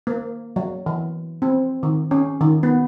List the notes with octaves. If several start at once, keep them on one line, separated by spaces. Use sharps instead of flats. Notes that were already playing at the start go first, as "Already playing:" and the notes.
A#3
F#3
E3
C4
D#3
C#4
D#3
B3